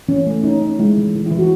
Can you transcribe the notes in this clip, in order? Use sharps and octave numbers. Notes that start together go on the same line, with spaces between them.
E3 C#4
A3
C#4 D#4
C#4
G#3 E4
E3
E3
E4
E3
F#4